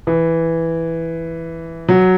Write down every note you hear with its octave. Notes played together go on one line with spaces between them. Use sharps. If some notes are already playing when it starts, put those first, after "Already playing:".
E3
F#3